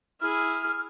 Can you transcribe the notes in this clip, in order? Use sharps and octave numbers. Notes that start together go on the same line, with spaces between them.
E4 G#4 F6